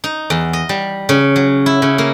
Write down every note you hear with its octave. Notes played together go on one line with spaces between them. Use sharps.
D#4
E2
D#5
G3
C#3
F#3
E4
C#3
A#3